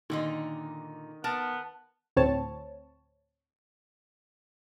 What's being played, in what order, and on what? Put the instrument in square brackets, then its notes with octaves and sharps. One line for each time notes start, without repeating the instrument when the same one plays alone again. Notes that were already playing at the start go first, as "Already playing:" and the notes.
[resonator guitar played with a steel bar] A#2 D3 D#4 [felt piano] D#3
[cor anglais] B3 [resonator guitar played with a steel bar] A#4 A5
[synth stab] D2 A2 C4 C#5 A5